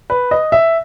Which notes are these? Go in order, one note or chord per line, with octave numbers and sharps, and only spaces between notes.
B4
D#5
E5